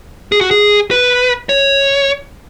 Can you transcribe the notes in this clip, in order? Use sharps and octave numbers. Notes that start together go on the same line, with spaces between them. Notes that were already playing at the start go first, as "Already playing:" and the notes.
G#4
F#4
G#4
B4
C#5